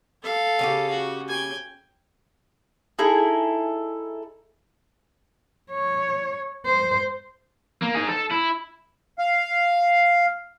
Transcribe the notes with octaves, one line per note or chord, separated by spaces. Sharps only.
A4 F5
C#3 C#4 G4
F#4
G5 G#5
D#4 E4 G#4 A4
C#5
C5
A#3
D#4 G#4
A4
E4
F5